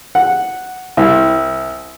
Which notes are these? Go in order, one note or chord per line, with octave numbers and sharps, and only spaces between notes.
F#5
C2